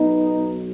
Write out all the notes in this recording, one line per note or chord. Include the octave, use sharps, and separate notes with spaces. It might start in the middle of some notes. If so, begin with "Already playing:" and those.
Already playing: B1 B2 B3 D#4